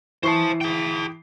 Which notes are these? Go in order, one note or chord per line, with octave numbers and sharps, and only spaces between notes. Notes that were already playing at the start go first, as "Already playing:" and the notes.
E3 C5 A5 C#6 C7
G#4 G5